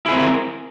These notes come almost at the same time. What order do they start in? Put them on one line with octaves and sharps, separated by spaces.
E4 G#4 C4 A#4